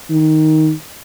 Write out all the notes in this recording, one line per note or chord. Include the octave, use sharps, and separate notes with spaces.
D#3